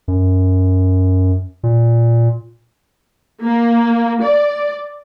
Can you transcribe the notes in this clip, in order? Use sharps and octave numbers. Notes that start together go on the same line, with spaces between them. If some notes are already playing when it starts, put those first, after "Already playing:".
F#2
A#2
A#3
D5